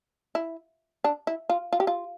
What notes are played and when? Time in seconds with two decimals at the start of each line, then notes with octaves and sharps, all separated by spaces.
0.35 E4
1.04 D4
1.27 E4
1.49 F4
1.73 F4
1.80 G4
1.87 F4